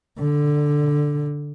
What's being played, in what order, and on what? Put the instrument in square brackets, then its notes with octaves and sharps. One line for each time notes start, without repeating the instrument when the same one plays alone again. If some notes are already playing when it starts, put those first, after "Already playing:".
[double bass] D3